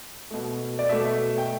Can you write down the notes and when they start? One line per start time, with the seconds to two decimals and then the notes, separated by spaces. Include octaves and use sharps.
0.31 B2 A3
0.79 D5
0.89 B2 A3 E5
1.38 G5